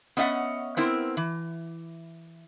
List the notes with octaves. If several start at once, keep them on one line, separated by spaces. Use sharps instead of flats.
B3 C#4 D#5 E5 F#5
B3 C4 E4 A#4
E3